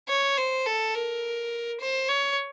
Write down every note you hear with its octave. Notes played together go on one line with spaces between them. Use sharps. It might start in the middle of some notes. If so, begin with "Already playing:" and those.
C#5
C5
A4
A#4
C5
C#5